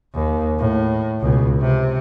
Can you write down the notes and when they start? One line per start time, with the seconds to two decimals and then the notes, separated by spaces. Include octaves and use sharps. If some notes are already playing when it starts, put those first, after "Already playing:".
0.14 D#2
0.59 A2
1.20 C#2 B2
1.60 C3